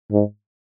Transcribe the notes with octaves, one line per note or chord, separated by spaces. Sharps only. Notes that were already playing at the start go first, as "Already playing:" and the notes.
G#2